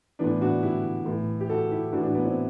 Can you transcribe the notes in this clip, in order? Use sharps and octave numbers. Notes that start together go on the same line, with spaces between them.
A2 E3 B3 D4
D4 F#4
E4 G4
A2 E3
G4
F#4 A4
E4 G4
A2 E3 D4 F#4
D4 F#4
B3 D4
C4 E4